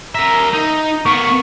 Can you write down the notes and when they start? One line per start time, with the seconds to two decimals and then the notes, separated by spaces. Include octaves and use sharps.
0.15 A#4 E5 A#5
0.54 D#4
1.06 B3 A#4 C#6